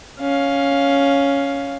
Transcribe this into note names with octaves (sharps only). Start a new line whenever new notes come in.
C#4 F5